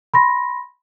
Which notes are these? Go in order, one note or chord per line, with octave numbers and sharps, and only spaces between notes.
B5 C6 A#6